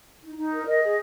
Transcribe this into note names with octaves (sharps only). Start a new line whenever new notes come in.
D#4
D#4
A#4
D#5
G#4